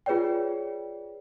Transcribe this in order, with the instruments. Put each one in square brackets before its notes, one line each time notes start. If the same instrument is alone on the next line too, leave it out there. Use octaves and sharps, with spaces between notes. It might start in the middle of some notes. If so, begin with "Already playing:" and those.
[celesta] F4 G#4 B4 C#5 D5 G5